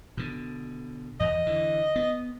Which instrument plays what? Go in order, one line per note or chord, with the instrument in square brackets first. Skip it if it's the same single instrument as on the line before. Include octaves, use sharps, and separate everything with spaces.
[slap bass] B2 D3
[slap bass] E2 [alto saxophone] D#5
[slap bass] D3 E3
B3